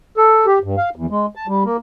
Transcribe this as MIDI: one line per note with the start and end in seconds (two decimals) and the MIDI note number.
0.17 0.46 69
0.46 0.59 67
0.64 0.75 43
0.77 0.89 77
0.96 1.06 40
1.10 1.26 56
1.35 1.47 81
1.48 1.63 55
1.64 1.77 58